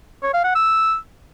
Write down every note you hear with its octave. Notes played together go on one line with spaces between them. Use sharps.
C#5
F5
F#5
E6